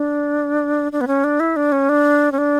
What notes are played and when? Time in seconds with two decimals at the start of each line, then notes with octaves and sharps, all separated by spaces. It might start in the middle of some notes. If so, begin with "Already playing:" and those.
Already playing: D4
0.92 D4
1.01 B3
1.07 C#4
1.24 D4
1.40 E4
1.56 D4
1.72 C#4
1.89 D4
2.32 C#4
2.38 D4